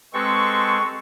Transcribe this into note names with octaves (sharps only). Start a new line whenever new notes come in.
G#3 C4 G4 A4 B4 C#6